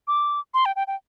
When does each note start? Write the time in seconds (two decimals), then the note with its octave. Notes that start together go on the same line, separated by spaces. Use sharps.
0.08 D6
0.54 C6
0.66 G5
0.76 G5
0.87 G5